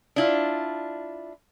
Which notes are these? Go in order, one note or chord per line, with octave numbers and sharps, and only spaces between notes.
D4 E4 F4